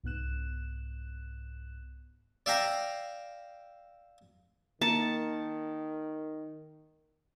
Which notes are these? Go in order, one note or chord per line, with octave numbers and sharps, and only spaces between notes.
C2 G#2 B3 F#6 E7
D5 E5 F5 G5 A#5
D#3 A#3 A5 A#5 C#7